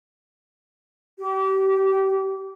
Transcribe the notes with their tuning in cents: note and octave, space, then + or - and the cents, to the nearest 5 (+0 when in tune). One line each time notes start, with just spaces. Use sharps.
G4 -30